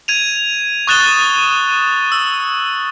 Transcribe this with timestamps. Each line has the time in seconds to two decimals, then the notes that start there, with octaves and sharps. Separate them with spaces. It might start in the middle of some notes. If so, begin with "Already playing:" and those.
0.08 G#6 D#7 F7
0.87 C#6 D#6 F#6 A6 E7 G7
2.12 E6